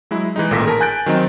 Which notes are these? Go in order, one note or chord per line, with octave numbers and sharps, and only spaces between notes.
F#3 G#3 E4
E3 G#3 D#4
A1 A#2 D#3 A4 A#6 B6
G#4 A#4 A5
G#5 F#6 G6 A6 D7
D#3 F#3 C4 D#4